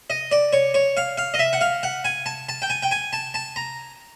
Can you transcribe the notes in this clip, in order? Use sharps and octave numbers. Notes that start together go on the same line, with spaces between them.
D#5
D5
C#5
C#5
F5
F5
D#5
E5
F#5
F5
F#5
G#5
A5
A5
G5
G#5
G5
G#5
A5
A5
A#5